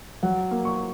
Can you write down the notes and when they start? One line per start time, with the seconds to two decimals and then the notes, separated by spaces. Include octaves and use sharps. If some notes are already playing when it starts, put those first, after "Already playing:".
0.23 F#3 F#5
0.51 A#3
0.65 C#6